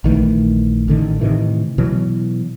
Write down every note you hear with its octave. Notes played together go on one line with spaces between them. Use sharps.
A#1 D#3 E3 A3
A1 D3 D#3
A2 C3 D#3 E3
B2 E3 F#3